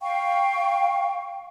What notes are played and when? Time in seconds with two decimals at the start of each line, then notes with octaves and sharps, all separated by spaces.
0.01 F5 G5 C#6